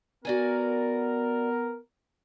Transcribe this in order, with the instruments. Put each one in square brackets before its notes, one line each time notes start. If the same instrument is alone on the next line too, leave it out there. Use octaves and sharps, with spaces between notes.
[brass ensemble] B3 A#4 [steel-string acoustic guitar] F#4 D5 G#5